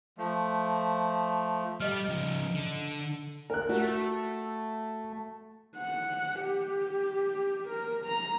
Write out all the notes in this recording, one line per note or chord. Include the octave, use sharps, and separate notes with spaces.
F3 A3
G3 D#5 F6
C#3 F3
D3
A#4 F#6
A3 F#4
F#5
G4
A#4
A#5